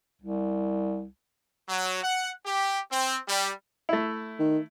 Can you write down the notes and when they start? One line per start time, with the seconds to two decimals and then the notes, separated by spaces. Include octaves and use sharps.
0.22 C2
1.69 F#3
2.03 F#5
2.45 G4
2.92 C4
3.27 G3
3.89 A3 E4
4.39 D#3